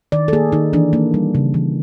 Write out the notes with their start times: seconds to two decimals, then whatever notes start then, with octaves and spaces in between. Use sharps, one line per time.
0.12 D#3 D5
0.28 A4
0.33 A#3 G#4
0.52 D#3 D#4
0.73 E3 D4
0.93 A#3
1.14 G3
1.35 C#3
1.54 E3